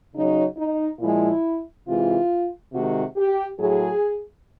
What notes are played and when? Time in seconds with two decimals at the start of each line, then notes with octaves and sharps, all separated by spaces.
0.14 C#3 F#3 D#4
0.57 D#4
1.00 A#2 F3 G#3 E4
1.86 C3 E3 G#3 F4
2.72 C3 D#3 G#3 F#4
3.16 G4
3.59 A2 F#3 G#4